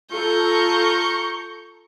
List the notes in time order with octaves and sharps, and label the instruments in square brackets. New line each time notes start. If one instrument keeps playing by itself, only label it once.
[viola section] F4 A4 [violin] A#5 G6 [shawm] C#6